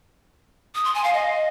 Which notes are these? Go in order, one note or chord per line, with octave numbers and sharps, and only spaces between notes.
D#6
C6
G#5
F5
D#5